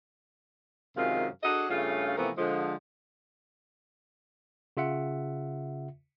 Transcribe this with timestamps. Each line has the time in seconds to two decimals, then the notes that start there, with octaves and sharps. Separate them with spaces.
0.95 F#2 C3 D#3 G#3 F4 F5
1.43 D4 F#4 G#4 A4 D#5
1.69 G2 C#3 A3 C#4 F4
2.17 C3 E3 F3 A3 B3 A#4
2.37 D3 F3 G#3
4.77 C#3 F4 E5 F#5